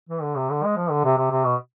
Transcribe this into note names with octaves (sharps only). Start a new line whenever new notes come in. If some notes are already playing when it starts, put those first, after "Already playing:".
E3
D3
C3
D3
G#3
F3
D3
C3
C3
C3
B2